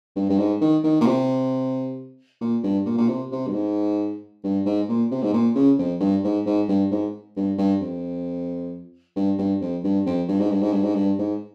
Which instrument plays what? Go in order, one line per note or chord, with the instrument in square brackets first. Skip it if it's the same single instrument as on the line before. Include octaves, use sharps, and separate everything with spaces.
[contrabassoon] G2
G2
G#2
D#3
D#3
A#2
C3
A#2
G2
A#2
A#2
C3
C3
G2
G#2
G2
G#2
A#2
C3
G#2
A#2
C#3
F2
G2
G#2
G#2
G2
G#2
G2
G2
F2
G2
G2
F2
G2
F2
G2
G#2
G2
G#2
G2
G#2
G2
G#2